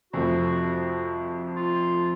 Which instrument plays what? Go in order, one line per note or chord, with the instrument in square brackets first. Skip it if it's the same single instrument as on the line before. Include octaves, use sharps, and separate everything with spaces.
[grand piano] F2 C3 F3 A3 [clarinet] F#4
[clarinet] F4